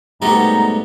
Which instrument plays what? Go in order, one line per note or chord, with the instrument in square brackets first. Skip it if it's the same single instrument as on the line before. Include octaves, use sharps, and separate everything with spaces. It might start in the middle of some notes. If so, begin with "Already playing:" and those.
[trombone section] C2 B3 D#4 [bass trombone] G#2 [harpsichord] B2 G3 A3 [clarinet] A#5